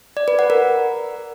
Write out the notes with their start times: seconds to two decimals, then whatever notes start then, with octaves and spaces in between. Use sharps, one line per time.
0.17 D5
0.28 B4
0.39 F#5
0.50 A#4